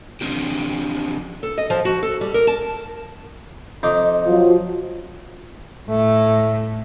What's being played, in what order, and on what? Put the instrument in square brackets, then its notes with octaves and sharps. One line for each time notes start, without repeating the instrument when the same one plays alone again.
[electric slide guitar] F3 C4 D4 G4
[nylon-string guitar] A4
D#5
F3
F#4
A4
G3
A#4
A5
[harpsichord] F2 D#4 D6
[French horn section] F3 F#3
[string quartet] A2 [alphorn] A3